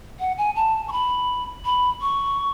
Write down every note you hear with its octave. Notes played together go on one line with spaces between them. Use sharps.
F#5
G#5
A5
C#6
B5
B5
C#6